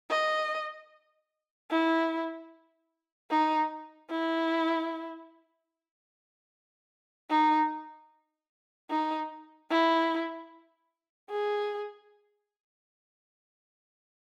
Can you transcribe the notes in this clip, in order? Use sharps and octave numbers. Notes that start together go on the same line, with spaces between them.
D#5
E4
D#4
E4
D#4
D#4
E4
G#4